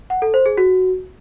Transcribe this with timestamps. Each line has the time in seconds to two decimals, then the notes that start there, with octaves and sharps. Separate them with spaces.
0.10 F#5
0.22 A4
0.34 C5
0.46 G#4
0.57 F#4